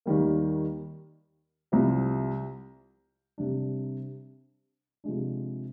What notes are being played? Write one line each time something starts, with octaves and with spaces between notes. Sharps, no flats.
D#2 D#3 G3 A#3
C2 C3 F3 C4
C3 G3 D4
C3 F3 G#3 D4